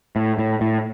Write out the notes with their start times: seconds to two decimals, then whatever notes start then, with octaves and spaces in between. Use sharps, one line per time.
0.16 A2
0.39 A2
0.61 A2